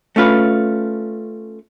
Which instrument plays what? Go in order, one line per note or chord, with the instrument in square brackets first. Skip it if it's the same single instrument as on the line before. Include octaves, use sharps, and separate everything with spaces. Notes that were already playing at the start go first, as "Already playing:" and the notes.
[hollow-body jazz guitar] A3 C#4 F4 B4